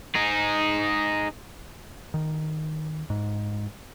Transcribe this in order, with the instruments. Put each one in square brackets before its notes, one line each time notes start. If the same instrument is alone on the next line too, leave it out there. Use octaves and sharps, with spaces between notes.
[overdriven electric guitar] D#4 G#4
[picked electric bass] D#3
G#2